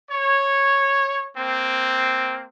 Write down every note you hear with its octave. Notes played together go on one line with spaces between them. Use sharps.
C#5
A#3 C4